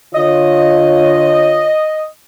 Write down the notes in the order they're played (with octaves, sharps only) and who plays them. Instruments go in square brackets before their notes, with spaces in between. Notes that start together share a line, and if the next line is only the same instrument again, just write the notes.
[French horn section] D3 F4 C#5 [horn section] D#5